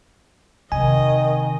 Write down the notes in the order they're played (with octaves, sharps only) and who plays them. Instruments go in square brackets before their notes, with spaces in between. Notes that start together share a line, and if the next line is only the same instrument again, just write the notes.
[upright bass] C3 F3 [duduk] D#3 [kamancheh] D#5 [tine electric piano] G#5